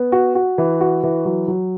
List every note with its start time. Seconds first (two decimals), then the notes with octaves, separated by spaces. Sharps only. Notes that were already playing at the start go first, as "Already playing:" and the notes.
Already playing: B3
0.12 F#4
0.35 F#4
0.58 E3
0.81 F#4
1.03 E3
1.25 F#3
1.48 F#3